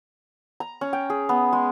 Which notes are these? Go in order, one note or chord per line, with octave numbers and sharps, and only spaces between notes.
A#5
C#4
G5
G#4
B3
G#3